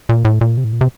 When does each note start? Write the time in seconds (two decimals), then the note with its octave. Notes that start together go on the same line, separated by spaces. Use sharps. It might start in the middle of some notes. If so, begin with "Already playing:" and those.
0.09 A#2
0.25 A2
0.41 A#2
0.57 C3
0.64 A2
0.73 A#2
0.81 C3